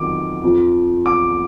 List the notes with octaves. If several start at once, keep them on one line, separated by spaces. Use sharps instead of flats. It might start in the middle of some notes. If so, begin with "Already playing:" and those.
Already playing: F2 D#3 F#3 D6
F2 F3
D6